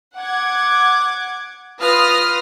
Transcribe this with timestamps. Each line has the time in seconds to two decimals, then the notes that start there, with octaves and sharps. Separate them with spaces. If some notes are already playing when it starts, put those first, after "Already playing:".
0.17 F#5 D6 G#6
1.80 F4 B4 D#6 F6 A#6